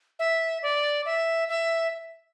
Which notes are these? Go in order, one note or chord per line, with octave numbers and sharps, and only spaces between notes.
E5
D5
E5
E5